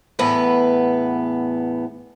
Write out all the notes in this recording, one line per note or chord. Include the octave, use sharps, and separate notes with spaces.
E2 A2 B3 B4